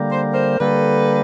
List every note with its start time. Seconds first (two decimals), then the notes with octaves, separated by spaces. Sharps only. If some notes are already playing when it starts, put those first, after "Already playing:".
Already playing: D3 G3 A#3
0.11 C5
0.32 A#4 C5
0.60 D3 G3 A#3 A4 B4